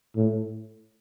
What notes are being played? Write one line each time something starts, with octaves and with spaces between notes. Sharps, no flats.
A2